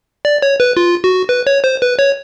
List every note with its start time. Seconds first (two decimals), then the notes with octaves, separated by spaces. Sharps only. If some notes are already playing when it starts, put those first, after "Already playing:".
0.25 D5
0.42 C#5
0.60 B4
0.77 F4
1.04 F#4
1.29 B4
1.47 C#5
1.64 C5
1.82 B4
1.99 C#5